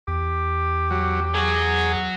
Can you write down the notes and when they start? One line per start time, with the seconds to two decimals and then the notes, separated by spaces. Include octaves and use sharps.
0.08 E2 G4
0.91 F#3
1.35 F#3 F#4 G#4